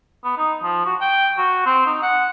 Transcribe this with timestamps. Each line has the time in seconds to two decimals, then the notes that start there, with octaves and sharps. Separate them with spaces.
0.24 B3
0.37 D#4
0.63 F3
0.86 F#4
1.01 G5
1.37 F#4
1.66 C4
1.86 D#4
2.02 F#5